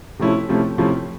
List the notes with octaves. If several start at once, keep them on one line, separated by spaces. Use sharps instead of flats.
C3 F3 A3 C#4 E4
C3 F3 A3 C#4 E4
C3 F3 A3 C#4 E4